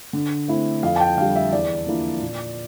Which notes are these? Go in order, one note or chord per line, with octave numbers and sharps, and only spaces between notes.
D3
A3 C4 E4
F2 F5
A5
G5
D3 G3 F5
E5
E2 D5
D3 F3 A#3 E4
A#2